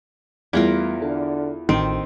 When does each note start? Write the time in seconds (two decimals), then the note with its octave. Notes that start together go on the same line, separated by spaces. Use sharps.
0.53 E2 G3 A3 E4 F4 A#4 F5
1.02 D3 A4
1.69 A1 D2 D#3 C4